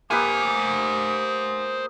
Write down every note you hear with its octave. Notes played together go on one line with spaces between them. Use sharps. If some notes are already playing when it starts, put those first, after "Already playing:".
A#3 G4 B4 C5 G#5 D#6